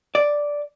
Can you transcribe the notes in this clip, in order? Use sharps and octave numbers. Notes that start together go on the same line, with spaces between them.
D5